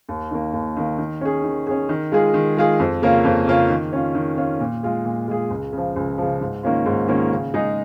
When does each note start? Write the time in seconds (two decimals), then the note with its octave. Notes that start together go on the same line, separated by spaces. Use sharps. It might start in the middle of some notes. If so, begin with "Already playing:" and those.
0.09 D#2
0.31 D#3 A#3
0.53 D#2
0.77 D#3 A#3
0.98 D#3
1.21 C#4 G#4
1.44 D#3
1.67 C#4 G#4
1.89 D#3
2.12 G#3 F4 G#4
2.34 D#3
2.57 G#3 F4 G#4
2.79 F2
3.02 C#3 A#3 C#4 F4
3.25 F2
3.47 C#3 A#3 C#4 F4
3.69 D#3
3.92 C#4 F4
4.15 D#3
4.37 C#4 F4
4.60 A#2
4.83 G#3 F4 G#4
5.05 A#2
5.28 G#3 F4 G#4
5.50 C#2
5.73 C#3 F3
5.96 C#2
6.18 C#3 F3
6.41 G#2
6.63 D#3 A#3 C#4 F4
6.86 G#2
7.08 D#3 A#3 C#4 F4
7.31 C#3
7.54 G#3 D#4 G#4